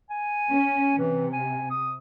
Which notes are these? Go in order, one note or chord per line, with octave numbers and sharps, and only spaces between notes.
G#5
C#4
C3 E3
G#5
D#6